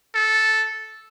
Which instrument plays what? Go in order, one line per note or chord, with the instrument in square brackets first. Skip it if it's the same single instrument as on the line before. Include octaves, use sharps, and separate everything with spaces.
[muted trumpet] A4